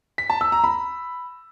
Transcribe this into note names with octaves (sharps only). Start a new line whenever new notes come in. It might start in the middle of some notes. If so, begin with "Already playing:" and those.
B6
A5
E6
A#5
B5